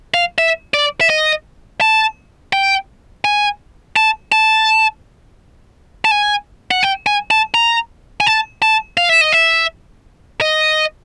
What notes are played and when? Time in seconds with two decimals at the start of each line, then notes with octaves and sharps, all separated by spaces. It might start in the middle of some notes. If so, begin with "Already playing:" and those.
0.14 F5
0.38 E5
0.74 D5
1.01 E5
1.10 D#5
1.81 A5
2.53 G5
3.25 G#5
3.96 A5
4.32 A5
6.05 A5
6.11 G#5
6.71 F#5
6.83 G5
7.07 G#5
7.31 A5
7.54 A#5
8.20 G#5
8.26 A5
8.62 A5
8.98 F5
9.09 E5
9.21 D#5
9.32 E5
10.41 D#5